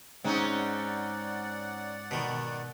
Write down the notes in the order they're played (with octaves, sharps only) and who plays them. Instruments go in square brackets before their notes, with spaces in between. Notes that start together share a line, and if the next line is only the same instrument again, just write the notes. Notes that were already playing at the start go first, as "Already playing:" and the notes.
[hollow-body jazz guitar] G#2 [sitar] C4 C#4 D#4 [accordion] D5 F#5
[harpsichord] B2 D#3